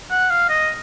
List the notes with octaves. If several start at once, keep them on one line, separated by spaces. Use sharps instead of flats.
F#5
F5
D#5